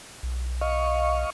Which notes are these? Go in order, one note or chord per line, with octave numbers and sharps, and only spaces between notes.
B1
D#5 F5 C#6